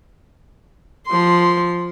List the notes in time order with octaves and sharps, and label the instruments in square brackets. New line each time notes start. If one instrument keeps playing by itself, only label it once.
[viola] F3 C6